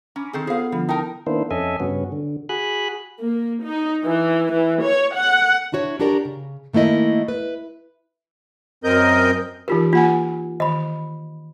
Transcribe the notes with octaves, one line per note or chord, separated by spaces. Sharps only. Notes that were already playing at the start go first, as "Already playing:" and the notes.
C#4 A#5 B5 D6
D#3 C4 G#4 A4
B3 F4 G#4 A4 C5 F5
D3 F3 G3
D#4 E4 A#4 G5 A5
D#3 A#3 B3 D4 E4 C5
F2 C#4 A4 D#5 E5 G#5
G2 C#3 B3 C#4 F#4
D3
F#4 G#4 G#5 B5 F#6
A#3
D#4
E3
E3
C#5
F#5
D4 E4 F#4 C#5
D4 F#4 G4 A#4 D5 A#5
C#3
D#3 A3 A#3 E4 D#5
B4
F#2 C4 A#4 D#5 G6
E3 D#4 F4 G4 A#4
A#3 F4 F#5 G#5
D#3 D#5 B5